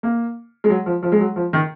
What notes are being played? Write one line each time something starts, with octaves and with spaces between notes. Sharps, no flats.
A#3
G#3
F#3
F3
F3
G#3
F#3
F3
D#3